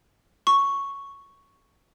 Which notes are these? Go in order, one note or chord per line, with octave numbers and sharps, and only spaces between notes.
C#6